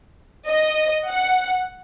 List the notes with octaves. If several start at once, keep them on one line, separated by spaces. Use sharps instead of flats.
D#5
F#5